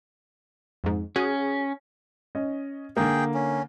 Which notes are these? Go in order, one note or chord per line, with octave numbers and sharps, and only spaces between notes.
F2 G#2
C#4 F#4 G#4
C#4 D#5
D3 A#3 G#4 G5
C#4